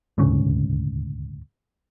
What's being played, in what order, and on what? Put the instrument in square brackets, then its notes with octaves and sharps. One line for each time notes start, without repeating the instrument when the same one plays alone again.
[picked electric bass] D#1 D2 G#2 C#3